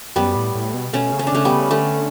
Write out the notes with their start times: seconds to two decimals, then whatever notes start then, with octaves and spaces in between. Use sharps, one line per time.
0.16 F#2 G3 B3
0.36 A2
0.55 A2
0.74 B2
0.93 B2 A3 C#4
1.12 C#3
1.19 C#4
1.27 D4
1.32 C#3 A3 C#4
1.45 G3 B3
1.52 C#3
1.71 D3 A3 C#4